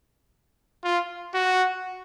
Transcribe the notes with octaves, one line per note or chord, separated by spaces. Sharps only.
F4
F#4